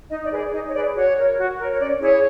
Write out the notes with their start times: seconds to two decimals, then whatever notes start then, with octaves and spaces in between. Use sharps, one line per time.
0.10 D#4 D#5
0.24 D5
0.31 G#4 B4
0.38 D5
0.53 D#4 D#5
0.67 C#5
0.74 G#4 B4 D5
0.95 F#4 C#5
1.16 A#4 C#5
1.38 F#4
1.58 A#4 C#5
1.70 C#5
1.80 C#4 D5
2.00 E4 G#4 C#5